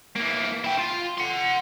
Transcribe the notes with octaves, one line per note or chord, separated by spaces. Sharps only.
E3 A#3
E4 G5
F4
F#5 C6